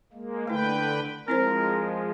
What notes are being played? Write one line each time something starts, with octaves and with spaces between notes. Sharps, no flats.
G#3 A#3
D3 A3 E4 B4 G5
F3 G#3 C4 E4 A#4 C5